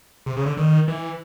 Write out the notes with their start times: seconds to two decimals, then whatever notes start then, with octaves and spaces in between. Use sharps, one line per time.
0.26 C3
0.37 C#3
0.46 D3
0.57 D#3
0.88 E3